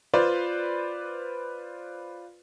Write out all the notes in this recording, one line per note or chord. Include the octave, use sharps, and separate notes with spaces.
F4 B4 C5 D5